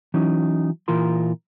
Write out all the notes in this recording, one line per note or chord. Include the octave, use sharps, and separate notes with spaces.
E3 F#3 C#4 D#4
A#2 E3 F4 A#4 C6